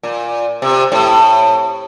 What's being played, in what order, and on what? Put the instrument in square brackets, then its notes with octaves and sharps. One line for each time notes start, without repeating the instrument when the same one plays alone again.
[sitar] A#2
C3
A2